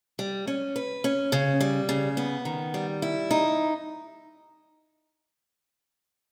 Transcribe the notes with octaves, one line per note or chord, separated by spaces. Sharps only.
G3
C#4
B4
C#4
C#3
G3
C#3
B3
D#3
G3
E4
D#4